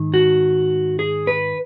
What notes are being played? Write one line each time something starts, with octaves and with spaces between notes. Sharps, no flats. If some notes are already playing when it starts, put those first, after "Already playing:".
Already playing: G#2 D#3
F#4
G#4
B4